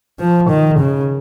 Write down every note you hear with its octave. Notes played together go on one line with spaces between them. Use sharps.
F3
D#3
C#3